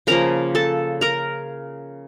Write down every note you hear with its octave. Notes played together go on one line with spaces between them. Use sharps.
C#3 F3 A#3 A#4 A#5
A4 A5
A#4 A#5